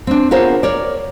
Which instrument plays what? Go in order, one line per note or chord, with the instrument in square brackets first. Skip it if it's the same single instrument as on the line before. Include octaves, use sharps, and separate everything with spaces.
[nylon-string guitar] C4 D4
B3 F4 G#4 A#4 C5 C#5
A#4 C#5 D5